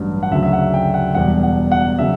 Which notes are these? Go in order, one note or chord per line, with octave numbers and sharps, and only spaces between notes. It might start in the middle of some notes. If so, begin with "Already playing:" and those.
Already playing: A1 G2 F#3
F#5
D2 C#3 F#3 E5
E5
F#5
G5
F#5
E1 E2 B2 G3 F#5
F#5
F#5
C#3 F#3 E5